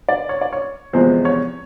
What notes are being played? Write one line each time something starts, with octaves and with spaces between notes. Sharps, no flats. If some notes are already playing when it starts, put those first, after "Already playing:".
D5
C#5
D5
C#5
E2 C3 F3 G#3 C5
C#5